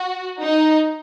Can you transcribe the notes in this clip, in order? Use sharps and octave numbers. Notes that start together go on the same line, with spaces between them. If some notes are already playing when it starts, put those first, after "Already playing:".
Already playing: F#4
D#4